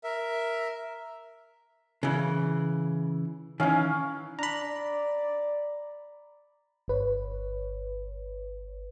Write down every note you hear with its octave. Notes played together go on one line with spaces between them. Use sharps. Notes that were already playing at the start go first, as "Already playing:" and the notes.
A#4 E5
C#3 E3
D#3 E3 C#4 F5
D4 A#5 B5
D5
G1 B4 C#5